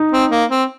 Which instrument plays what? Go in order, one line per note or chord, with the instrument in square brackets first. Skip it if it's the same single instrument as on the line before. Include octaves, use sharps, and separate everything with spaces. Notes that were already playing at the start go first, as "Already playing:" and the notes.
Already playing: [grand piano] D#4
[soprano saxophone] C4
A#3
C4